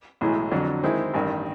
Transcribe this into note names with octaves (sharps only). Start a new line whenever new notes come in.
B1 A2 E3 G#3
F2 D3 F#3
D#3 G#3 C4 E4
A1 G2 D#3